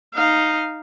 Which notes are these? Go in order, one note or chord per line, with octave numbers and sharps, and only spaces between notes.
D#4 F5